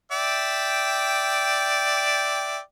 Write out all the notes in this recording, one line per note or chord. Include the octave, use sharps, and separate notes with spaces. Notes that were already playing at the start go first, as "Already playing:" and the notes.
D5 E5 G5